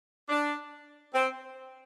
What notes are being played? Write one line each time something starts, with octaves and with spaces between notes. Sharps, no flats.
D4
C4